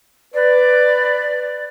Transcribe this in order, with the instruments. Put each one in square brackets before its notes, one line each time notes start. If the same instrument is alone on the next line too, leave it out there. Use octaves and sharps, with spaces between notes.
[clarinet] B4 [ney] D5